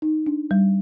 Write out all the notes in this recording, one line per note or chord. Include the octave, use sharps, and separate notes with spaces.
D#4
D4
G3